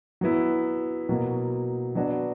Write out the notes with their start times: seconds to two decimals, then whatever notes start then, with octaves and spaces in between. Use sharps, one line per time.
0.21 F#3 B3 E4
1.09 B2 F#3 A#3
1.95 F#3 B3 D4 F#4